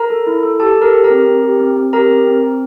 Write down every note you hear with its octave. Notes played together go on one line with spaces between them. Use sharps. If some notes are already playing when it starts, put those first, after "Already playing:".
Already playing: A#4 A#5
A4
E4
A4
G4 A4 A5
G4 A#4 A#5
G4
A#4 A#5
C4
C4
G4
C4
C4
G4 A#4 A#5
C4
C4
C4